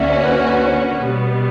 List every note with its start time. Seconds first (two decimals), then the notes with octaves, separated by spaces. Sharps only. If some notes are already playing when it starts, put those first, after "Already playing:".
Already playing: D2 D3 A#3 C#4 F#4 D5 E5
0.10 C#5
0.24 B4
0.28 C#5
0.47 B4
0.66 C#5
1.04 B2 G3 B3